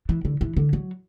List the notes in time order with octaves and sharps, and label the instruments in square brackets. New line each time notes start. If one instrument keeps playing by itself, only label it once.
[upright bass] E3
D3
E3
D3
F#3